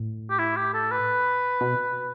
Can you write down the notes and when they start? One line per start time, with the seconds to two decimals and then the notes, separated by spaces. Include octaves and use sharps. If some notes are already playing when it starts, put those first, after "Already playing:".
Already playing: A2
0.30 G4
0.39 E4
0.57 G4
0.74 A4
0.91 B4
1.61 B2